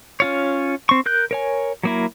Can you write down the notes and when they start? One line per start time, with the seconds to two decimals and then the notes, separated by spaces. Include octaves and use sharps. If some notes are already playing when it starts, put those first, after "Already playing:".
0.20 C#4 F4 C#5
0.89 C4 C#6
1.06 A#4 F#6 G6
1.31 A#4 C#5 G#5
1.83 F#3 A#3 E4